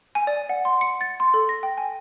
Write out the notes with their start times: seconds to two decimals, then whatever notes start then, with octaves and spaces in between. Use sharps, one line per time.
0.15 G#5
0.27 D5
0.49 F#5
0.65 C6
0.81 C#7
1.01 A6
1.20 C6
1.34 A4
1.49 A#6
1.63 G5
1.78 G#5